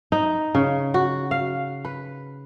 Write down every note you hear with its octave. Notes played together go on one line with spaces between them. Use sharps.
D#4
C#3
F#4
F5
B4